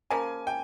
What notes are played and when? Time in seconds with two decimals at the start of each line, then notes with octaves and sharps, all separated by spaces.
0.10 C#3 F3 A#3 G#5
0.47 G5